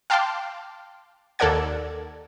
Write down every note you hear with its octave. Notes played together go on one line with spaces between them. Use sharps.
F5 G5 A5 C6 D6 F6
D#2 A4 A#4 D5 F#5 G#6